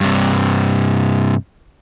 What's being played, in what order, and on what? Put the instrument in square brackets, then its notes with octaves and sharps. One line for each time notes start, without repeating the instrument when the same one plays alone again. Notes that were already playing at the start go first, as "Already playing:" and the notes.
[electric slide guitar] G2 C3